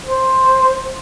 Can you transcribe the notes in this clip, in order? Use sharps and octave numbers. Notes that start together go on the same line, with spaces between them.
C5